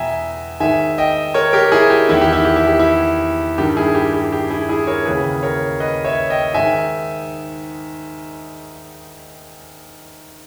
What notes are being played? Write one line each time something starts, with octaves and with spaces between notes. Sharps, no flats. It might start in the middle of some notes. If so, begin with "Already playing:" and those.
Already playing: E2 B2 E5 G5 G#5 A#5
G#2 D#3 E5 G#5
D#5 G5
A#4 C#5
G4 A#4
E4 G#4
G4
E2 D#3 E4
G4
E4
G4
E4
G4
E4
G2 D#3 G4
E4 G#4
G4
G4
G4
E4 G#4
E4 G#4
A#4 C#5
D#2 C#3 E3 G#4 B4
A#4 C#5
B4 D#5
C#5 E5
D#5 G5
G#2 D#3 E5 G#5